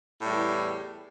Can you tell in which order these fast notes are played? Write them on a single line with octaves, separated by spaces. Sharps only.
A2 G3 E2